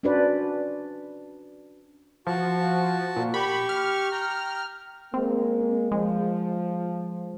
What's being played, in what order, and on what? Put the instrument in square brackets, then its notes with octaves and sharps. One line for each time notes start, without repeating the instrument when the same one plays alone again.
[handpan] C#4 D4 F#4 B4 C5 D5
[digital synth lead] F3 [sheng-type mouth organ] F#4 A5
[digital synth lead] A#2
[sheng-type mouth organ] G4 C#6 [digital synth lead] B5
[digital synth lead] F6
[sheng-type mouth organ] G5 A#5
[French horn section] G#3 A#3 [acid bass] C4
[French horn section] F3 [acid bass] G#3